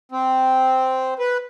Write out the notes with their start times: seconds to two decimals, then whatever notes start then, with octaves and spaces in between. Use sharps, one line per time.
0.12 C4
1.19 B4